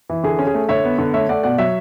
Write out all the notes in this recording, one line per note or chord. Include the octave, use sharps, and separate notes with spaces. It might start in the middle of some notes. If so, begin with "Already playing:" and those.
E3
D3 G#4
C#4
G#4
A3
D3 C#5 E5
B3
D3
A3 C#5 E5
A3 D5 F#5
B2 D5 F#5
F#3 C#5 E5